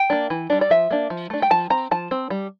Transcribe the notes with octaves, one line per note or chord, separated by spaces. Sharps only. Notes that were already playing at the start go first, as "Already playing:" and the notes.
Already playing: G5
A#3 D4
E3
G3 D4
D5
F3 E5
A#3 D4
F3
A3 D4
G5
F3 A5
C4 A#5
F3 A5
C4
G3